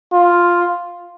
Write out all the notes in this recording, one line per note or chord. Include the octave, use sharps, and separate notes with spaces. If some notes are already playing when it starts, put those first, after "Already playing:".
F4